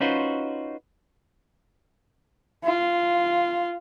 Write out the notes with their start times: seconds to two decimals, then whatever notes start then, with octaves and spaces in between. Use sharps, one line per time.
0.01 C#4 D#4 F4 F#4 B4 C5
2.64 F4